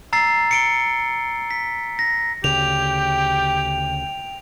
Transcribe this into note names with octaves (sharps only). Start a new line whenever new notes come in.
A#5 E6 A6 C7
C#7 D7 G7
B6
A#6
D2 C#3 G4 G5 F7